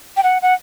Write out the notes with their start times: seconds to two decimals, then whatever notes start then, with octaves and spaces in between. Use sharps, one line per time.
0.17 G5
0.23 F#5
0.42 F#5